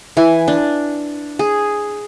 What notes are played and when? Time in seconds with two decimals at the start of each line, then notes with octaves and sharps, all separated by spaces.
0.17 E3 G#5
0.48 D4
1.39 G#4